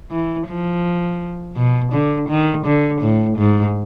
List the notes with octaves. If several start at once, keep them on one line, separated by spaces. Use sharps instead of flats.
E3
F3
B2
D3
D#3
D3
A2
G#2